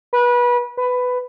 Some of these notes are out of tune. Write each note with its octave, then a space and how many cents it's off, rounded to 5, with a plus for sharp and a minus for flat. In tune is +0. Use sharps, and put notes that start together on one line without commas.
B4 -25
B4 +15